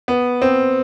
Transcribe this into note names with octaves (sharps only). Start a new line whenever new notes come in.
B3
C4